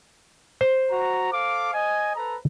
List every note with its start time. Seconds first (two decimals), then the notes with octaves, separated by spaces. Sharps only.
0.61 C5
0.91 F#4 A#5
1.32 A4 F5 D6
1.73 D#5 G#5
2.16 A4 B4 A#5